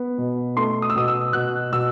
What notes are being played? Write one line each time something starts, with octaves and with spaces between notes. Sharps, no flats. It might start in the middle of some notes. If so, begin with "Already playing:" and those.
Already playing: B3
B2
A3 C6
D#6
E6
B2 D#6
E6
B2 F#6
B2 E6